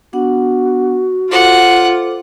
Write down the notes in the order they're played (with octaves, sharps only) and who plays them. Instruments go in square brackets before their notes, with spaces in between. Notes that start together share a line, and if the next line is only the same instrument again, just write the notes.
[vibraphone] B3 D4 F#5 [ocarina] F#4
[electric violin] F4 [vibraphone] A4 C5 D6 [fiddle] F#5